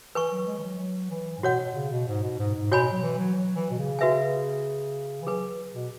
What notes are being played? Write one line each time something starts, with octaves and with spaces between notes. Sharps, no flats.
E3 B4 G#5 C#6
F#3
G#3
E3
F#3
F#3
E3
G#2
B2 F#4 C#5 F#5
B2
C#3
B2
G#2
B2
G#2
G#2
B2 F#4 C#5 G#5 B5
F#3
E3
F#3
F#3
E3
B2
C#3
F#4 B4 E5 G#5
E3
F#3 G#4 B4 G#5
B2